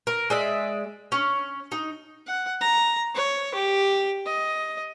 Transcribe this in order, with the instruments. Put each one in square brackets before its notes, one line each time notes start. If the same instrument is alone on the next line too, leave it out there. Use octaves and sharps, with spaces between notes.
[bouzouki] A#4
G#3 D5 E5
C#4
D#4
[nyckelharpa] F#5
A#5
C#5
G4
D#5